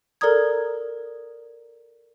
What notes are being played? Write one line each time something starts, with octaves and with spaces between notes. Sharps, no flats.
A4 A#4 D5 A#5 D#6 G#6